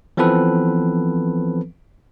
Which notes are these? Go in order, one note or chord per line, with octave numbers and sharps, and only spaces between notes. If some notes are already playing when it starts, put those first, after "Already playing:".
E3 F3 B3 C4 A4 B4